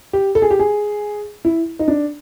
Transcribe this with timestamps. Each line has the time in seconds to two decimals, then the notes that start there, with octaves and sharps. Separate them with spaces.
0.13 G4
0.35 A4
0.42 G#4
0.51 G4
0.59 G#4
1.45 E4
1.79 D#4
1.88 D4